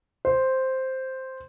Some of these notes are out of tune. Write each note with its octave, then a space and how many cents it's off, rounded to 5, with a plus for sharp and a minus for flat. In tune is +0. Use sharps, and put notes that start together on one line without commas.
C5 +0